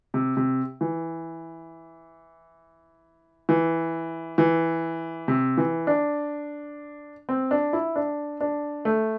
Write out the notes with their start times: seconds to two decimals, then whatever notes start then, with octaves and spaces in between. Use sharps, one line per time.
0.14 C3
0.37 C3
0.81 E3
3.49 E3
4.38 E3
5.28 C3
5.57 E3
5.87 D4
7.29 C4
7.51 D4
7.73 E4
7.96 D4
8.41 D4
8.85 A3